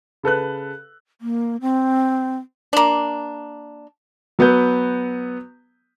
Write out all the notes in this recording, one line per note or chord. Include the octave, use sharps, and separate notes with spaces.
C#3 A4 B4 F#6
A#3
C4
A#3 D4
F#3 B3 B4 G6